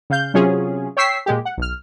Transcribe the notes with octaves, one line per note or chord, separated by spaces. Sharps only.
C#3 F5 G6
C3 F#3 C#4 F4 G#4
C#5 G5 C#6 E6 B6 C7
A#2 G#3 G4
F#5
B1 F6